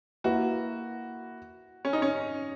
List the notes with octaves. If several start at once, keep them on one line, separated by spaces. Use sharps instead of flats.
A#3 E4 F#4 B4
C#4
D#4
C#4